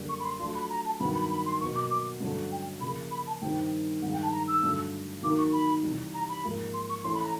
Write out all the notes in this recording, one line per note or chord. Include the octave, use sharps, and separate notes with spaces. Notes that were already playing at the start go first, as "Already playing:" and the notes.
Already playing: F#2 D3 G3 A#3
C#6
B5
C6
F#3 A3 D4 F4 C6
B5
A#5
A5
G2 D#3 F#3 B3 D#4 B5
B5
B5
C6
B2 F#3 A#3 C#6
D6
D6
G2 D3 F#3 A3 C#4
G5
C#3 F3 A#3 B5
B5
A5
G2 D#3 G3 C4 G5
G2 D#3 G#3 F#5
G5
A5
A#5
E6
G2 D3 F#3 A3 D4
D#3 F#3 A#3 D#4 D6
C#6
B5
C3 E3 G3
A#5
B5
G#2 F3 A#3
C6
C#6
E3 A3 C#4 E4 C6
B5
A#5